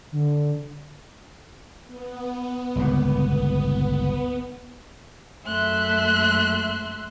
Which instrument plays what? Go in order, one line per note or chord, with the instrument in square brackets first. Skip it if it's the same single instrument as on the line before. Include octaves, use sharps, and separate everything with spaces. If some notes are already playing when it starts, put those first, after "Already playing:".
[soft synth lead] D3
[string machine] B3
[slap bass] G1 C#2 A#2
[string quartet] F#2 A3 E5 C6 F#6